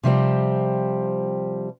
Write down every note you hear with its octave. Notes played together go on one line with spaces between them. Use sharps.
C3 F3 G3 C4